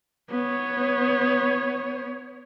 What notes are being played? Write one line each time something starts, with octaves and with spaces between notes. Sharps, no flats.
B3 C#5